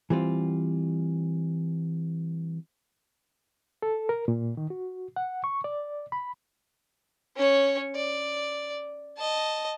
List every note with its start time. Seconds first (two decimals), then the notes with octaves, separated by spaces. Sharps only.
0.10 E3 G3 C4 F4
3.82 A4
4.09 A#4
4.28 A#2
4.57 D#3
4.70 F#4
5.16 F#5
5.44 C#6
5.64 D5
6.12 B5
7.36 C#4 C#5
7.95 D5
9.18 D#5 A5